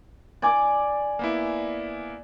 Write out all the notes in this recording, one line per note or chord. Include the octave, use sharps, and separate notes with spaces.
D5 G#5 D6
A#3 B3 E4